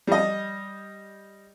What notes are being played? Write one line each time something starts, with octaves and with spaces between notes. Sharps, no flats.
G3 D#5